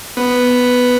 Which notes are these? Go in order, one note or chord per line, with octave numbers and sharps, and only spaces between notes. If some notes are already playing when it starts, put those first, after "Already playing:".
B3